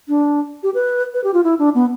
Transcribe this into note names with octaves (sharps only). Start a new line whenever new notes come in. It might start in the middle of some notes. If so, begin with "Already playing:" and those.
D4
G4
B4
B4
G4
F4
E4
D4
B3